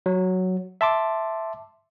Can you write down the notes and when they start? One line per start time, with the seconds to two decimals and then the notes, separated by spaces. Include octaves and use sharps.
0.06 F#3
0.81 E5 A5 C6 D6